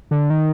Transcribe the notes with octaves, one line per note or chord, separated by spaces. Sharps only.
D3
D#3